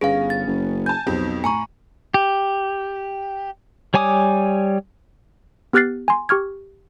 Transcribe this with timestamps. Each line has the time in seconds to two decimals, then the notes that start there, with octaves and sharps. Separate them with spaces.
0.01 G1 B3 C#4 G#4 F5
0.30 A6
0.47 F#1
0.86 G#5 A5 G6
1.07 B1 F2 C4 G4
1.44 A2 G#5 A#5 C#6
2.14 G4
3.94 G3 C#5 G#5 D6 D#6
5.73 B3 G4 F6 F#6 A6 C7
6.08 G#5 C6
6.29 G4 C#6 F6 G#6